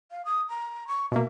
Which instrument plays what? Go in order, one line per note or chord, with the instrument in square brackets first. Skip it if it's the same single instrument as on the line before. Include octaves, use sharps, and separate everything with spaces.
[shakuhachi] F5
D#6
A#5
C#6
[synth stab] B2 A#3 [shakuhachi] E5